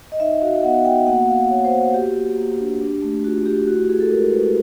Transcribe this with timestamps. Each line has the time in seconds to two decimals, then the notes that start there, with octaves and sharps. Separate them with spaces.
0.12 D#5
0.20 D#4 E5
0.42 F#4 F5
0.63 B3 F#5
0.85 F#4 G5
1.06 A#3 F#5
1.29 A#3 F5
1.50 A#3 C#5
1.65 C5
1.73 F#4
1.94 F#4 G4
2.15 A#3
2.37 A#3
2.59 D4
2.81 D4
3.02 A3
3.24 F4 F#4
3.46 A3 G4
3.67 E4 F#4
3.79 G4
3.89 E4 G#4
4.00 A4
4.10 G#3 A#4
4.33 G#3 B4